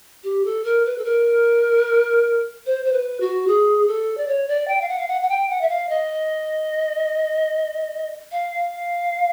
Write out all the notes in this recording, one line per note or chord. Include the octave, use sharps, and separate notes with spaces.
G4
A4
A#4
B4
A4
A#4
C5
C5
B4
F#4
G#4
A4
D5
C#5
D5
G5
F5
F#5
F5
F#5
F#5
G5
F#5
E5
F5
D#5
F5